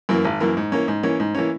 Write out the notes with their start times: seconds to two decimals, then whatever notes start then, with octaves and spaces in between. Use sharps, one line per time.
0.09 F#2 E3 A#3
0.25 G#1
0.40 F#2 E3 A#3
0.57 G#2
0.72 E3 A#3 C#4
0.88 G#2
1.03 E3 A#3 C#4
1.20 G#2
1.35 E3 A#3 C#4